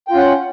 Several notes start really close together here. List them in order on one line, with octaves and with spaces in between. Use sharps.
G5 F4 C#4 F#5